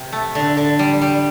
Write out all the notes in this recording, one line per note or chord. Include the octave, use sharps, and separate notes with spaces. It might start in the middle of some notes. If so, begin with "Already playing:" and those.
Already playing: C3
A3
D3
D3
G3
G3